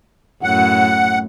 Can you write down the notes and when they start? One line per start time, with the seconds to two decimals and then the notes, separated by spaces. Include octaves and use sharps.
0.43 F#2 A2 F#5